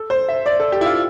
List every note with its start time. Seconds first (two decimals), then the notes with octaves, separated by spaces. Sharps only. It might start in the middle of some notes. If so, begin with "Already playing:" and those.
Already playing: A4
0.10 C5
0.28 E5
0.46 D5
0.60 A4
0.72 G4
0.81 E4
0.86 F4